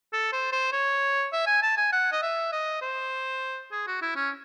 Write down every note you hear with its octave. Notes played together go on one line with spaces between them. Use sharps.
A4
C5
C5
C#5
E5
G#5
A5
G#5
F#5
D#5
E5
D#5
C5
G#4
F#4
E4
C#4